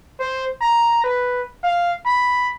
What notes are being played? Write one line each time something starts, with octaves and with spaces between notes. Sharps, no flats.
C5
A#5
B4
F5
B5